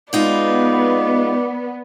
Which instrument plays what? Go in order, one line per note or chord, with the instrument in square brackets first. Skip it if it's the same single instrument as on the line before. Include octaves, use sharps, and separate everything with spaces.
[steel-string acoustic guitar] G#3 D#4 F4 [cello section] B3 [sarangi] D5